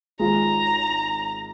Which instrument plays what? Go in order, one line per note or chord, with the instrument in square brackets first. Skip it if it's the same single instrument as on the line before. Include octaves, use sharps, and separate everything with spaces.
[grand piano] G#1 G#2 G#3 F4 G#4 [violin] A#5